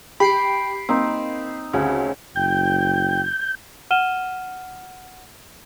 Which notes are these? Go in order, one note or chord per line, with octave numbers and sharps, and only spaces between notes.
G4 B5 C7 D7
A#3 C4 D#4
D2 C#3
F#1 G5 G6
F#5 F6 D#7 E7 G7